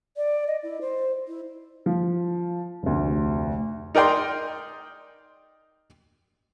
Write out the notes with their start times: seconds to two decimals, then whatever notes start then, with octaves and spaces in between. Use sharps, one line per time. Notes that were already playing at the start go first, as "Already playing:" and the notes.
0.17 D5
0.47 D#5
0.63 E4
0.81 C5
1.28 E4
1.86 F3
2.83 F1 D2
3.95 D#4 A#4 D5 G5 C6